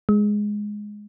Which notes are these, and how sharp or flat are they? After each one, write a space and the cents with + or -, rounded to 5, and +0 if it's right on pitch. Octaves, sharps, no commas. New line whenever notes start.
G#3 +0